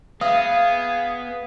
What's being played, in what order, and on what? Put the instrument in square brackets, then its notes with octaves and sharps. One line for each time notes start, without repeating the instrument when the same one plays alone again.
[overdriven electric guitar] B3 [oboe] G#4 [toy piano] E5 D#6 [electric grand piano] F5